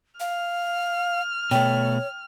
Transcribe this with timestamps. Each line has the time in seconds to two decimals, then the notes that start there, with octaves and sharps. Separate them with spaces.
0.20 F5 F6
1.51 B2 A3 C#5 G5